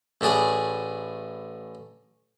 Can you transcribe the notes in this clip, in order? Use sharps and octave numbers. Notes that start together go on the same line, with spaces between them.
A1 A2 D4 G#4 G#5